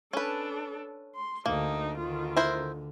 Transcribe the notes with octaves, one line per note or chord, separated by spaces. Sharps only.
C#4 D4 A4 B4
C6
D2 A#3 D4 D#4
D2 D3 D#3 F4
E4 A#4 C5